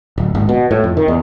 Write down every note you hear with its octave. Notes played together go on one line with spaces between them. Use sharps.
D1
G#1
B2
A2
F2
D#3
E2